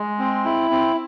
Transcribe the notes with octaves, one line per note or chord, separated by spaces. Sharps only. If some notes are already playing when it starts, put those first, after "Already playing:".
Already playing: G#3
C4
E4
C4